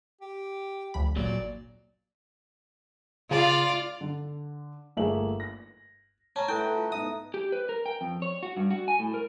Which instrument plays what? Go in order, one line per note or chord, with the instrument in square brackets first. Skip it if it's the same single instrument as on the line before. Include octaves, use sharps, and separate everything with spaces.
[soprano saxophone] G4
[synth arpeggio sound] D2 F3 B5
[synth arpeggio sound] G#1 [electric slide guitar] A#2 F#3 [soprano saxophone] D5
[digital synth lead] C#3 [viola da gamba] F4 [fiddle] D5 F5
[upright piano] D3
G1 A3 A#3 G#4 E5 F#7
A#6
[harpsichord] C#4 [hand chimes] A5 A#5
[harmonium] A3 B4 F#5 [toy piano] E4 A4 [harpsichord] G5
[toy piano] F4
[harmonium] G#2 B3 D#4 [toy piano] E5 [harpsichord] D#6
[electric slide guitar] G4
B4
A#4
G5
F2
C#5
F#4
G2
F#4
G#5
A2
A#4